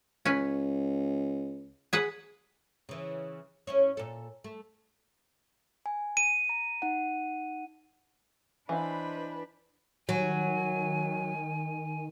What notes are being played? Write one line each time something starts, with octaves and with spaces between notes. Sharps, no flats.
C#2 C#4 B4
G#4 B4 F#5
C#3 E3
C#4 E4 C#5
A#2 A4
A3
G#5
D#7
A#5
D#4 F#5
E3 D4 B4 C5 D#5 F5 B5
D#3 F#3 G#5